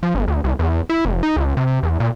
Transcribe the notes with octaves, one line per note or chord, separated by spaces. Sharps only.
F3
G1
D2
C2
E2
E4
F1
D#4
C#2
C3
E2
A#2